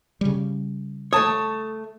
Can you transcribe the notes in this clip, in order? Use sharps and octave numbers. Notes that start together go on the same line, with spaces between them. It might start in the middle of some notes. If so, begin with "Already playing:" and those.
C#3 G3
A3 C#5 A5 D#6